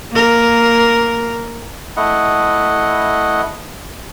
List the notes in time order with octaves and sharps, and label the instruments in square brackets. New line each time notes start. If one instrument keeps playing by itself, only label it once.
[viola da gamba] A#3 A#4
[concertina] A3 E4 D#5 F#5